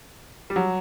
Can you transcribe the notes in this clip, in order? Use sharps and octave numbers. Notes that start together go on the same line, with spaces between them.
G3
F#3